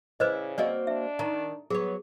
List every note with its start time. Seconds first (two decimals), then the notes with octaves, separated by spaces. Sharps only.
0.20 C#3 E4 B4 C5 D5 D#5
0.58 A#3 C4 F#4 D5 D#5
0.87 D4 E5
1.19 D#3 A5 A#5
1.70 F#3 B3 G#4 C#5